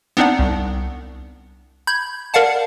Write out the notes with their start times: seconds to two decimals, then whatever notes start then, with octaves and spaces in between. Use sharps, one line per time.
0.17 B3 C4 D4 D#4 D5 F#5
0.39 C2
1.87 B5 G6 G#6
2.34 A#4 D5 F5 F#5 A5